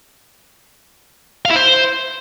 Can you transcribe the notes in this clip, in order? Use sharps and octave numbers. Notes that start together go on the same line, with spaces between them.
F5
E4
C5